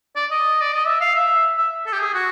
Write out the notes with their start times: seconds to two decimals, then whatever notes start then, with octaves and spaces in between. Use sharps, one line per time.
0.16 D5
0.31 D#5
0.61 D5
0.73 D#5
0.86 E5
1.01 F5
1.15 E5
1.58 E5
1.86 A4
1.93 G4
2.00 G#4
2.14 F#4